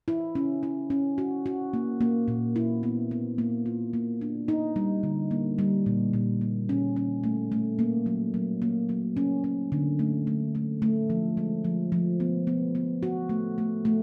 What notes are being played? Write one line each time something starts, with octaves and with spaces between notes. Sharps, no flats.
E4
C#4
E4
C#4
F#4
F#4
A#3
A#3
A#2
E4
B3
B3
A#3
F4
A#3
D4
D#4
G3
D3
A#3
G3
A#2
A#2
A#3
C#4
C#4
A3
A3
A#3
F#3
F#3
A#3
F#3
C#4
C#4
D3
A3
A3
A3
A3
F3
G#3
F3
F3
B3
B3
B3
F#4
A3
A3
A3